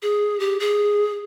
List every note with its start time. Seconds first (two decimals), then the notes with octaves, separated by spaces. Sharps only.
0.02 G#4
0.40 G4
0.60 G#4